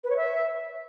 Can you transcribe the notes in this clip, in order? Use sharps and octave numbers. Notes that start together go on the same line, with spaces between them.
B4
C#5
E5